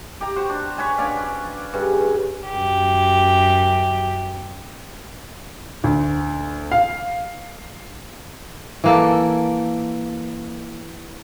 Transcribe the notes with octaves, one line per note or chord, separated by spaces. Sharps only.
G4 A#5
F#4 C5
D4
B4 C#5 G#5
C#4 D4 D5 F5
G2 C#3
F#2 G4
D2
F5
E3 A#3 A4